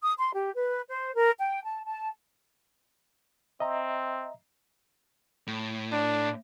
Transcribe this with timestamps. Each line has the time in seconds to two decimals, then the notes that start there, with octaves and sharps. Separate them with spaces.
0.02 D#6
0.18 C6
0.33 G4
0.55 B4
0.88 C5
1.14 A#4
1.39 G5
1.63 A5
1.85 A5
3.60 C4 D#5 E5 A#5
5.47 A2
5.92 D4